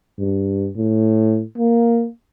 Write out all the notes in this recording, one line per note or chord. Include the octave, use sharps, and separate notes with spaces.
G2
A2
A#3